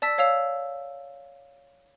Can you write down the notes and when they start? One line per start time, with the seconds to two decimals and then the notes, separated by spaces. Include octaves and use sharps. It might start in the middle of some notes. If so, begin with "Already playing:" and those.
0.02 D5 A5 E6 B6
0.18 C#5 F5 E6 F7